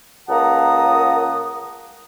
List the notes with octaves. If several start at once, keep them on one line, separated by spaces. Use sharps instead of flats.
C#2 A#3 F#5 A5 A#5 D#6